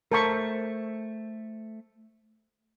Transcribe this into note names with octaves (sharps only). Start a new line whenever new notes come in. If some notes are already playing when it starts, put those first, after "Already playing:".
A3 A#4 C5 E5 A5 C#6